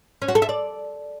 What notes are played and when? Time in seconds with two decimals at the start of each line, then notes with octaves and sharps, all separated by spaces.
0.22 C#4
0.28 F#4
0.35 A4
0.42 E5
0.49 D5